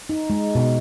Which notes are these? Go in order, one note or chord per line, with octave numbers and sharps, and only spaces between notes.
D#4
G#3
B2